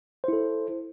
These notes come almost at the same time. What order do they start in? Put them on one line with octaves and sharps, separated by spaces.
C5 E4 A4